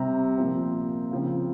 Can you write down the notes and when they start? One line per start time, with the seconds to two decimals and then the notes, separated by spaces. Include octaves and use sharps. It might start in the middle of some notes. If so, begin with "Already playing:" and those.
Already playing: C3 G3 C4 A#5
0.37 A#2 F3 C4
1.11 C#3 F3 C4